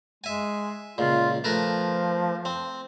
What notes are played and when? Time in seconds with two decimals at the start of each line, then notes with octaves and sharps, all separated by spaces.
0.24 G#3 E5 G#5
0.98 C#2 A#2 F4
1.44 F3 A3 A#4 B4
2.45 C4